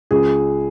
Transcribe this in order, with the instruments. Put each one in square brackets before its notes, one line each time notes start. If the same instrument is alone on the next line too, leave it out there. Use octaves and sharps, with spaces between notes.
[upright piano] C#2 G#4